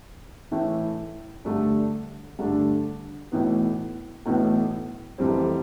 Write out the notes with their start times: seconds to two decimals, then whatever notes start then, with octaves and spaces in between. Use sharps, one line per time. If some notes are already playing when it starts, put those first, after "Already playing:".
0.52 A2 E3 A3 E4
1.45 G2 D3 A3 D4
2.39 G2 D3 A3 D4
3.32 B1 A2 E3 B3
4.26 B1 A2 E3 B3
5.18 F1 F2 E3 G3 C4